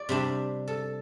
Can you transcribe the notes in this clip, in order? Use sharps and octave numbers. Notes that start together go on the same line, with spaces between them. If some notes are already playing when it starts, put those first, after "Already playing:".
Already playing: D5
C3 G3 D4
A4